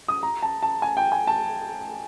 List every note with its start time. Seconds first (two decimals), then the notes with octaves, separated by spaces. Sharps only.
0.08 D#6
0.23 A#5
0.42 A5
0.62 A5
0.82 G#5
0.97 G5
1.12 G#5
1.27 A5